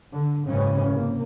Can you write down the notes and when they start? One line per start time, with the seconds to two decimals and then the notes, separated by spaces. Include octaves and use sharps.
0.13 D3
0.46 F#1 G#2 C#3 E3 C#4
0.90 C3 A#3